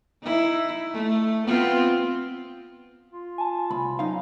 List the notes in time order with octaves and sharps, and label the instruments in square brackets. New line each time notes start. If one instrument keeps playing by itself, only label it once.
[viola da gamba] D#4 E4
A3
B3 C4 F4
[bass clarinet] F4
[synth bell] G#5 A5
[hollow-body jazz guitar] C2 [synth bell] B5
[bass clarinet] F#3 [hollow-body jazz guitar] D#4 F5